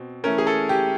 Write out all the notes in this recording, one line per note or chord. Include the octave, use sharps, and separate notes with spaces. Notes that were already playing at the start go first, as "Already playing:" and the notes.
Already playing: B2 C4
E3 A3 C#4 A#4
G#4
A4
G4